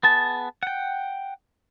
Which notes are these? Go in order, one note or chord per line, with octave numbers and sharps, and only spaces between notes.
B3 G#4 A5
F#5 G5